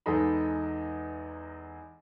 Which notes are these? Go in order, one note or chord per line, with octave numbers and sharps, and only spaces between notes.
E2 G#3 D#4 A4 D#5 B5